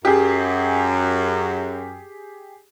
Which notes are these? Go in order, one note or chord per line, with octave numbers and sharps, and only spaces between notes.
F#2 G4 G#4